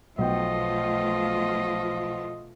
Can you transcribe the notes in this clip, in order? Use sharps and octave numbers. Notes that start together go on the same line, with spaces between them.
B1 B2 F3 A3 F4 D#5 G5